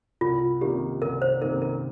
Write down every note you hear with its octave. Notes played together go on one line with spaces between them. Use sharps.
C2 F4
C3 D#3 A#3 D#4 G4
C2 A#4
C5
C3 D#3 A#3 D#4 A#4
A#4